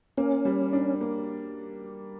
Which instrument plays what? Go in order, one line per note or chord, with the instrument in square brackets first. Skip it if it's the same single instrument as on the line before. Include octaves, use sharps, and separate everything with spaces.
[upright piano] A#3 [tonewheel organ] C#4
[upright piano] G3
D4
A#3